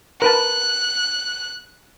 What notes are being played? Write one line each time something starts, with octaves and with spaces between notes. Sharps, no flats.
A#4 B4 A5 F#6